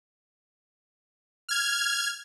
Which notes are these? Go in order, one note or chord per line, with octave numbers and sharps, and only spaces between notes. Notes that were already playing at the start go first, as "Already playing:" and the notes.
F6 G#6